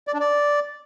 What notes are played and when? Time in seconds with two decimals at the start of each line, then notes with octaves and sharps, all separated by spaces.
0.07 D5
0.14 D4
0.20 D5